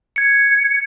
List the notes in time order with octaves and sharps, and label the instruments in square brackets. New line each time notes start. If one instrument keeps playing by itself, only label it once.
[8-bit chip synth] G#6 C#7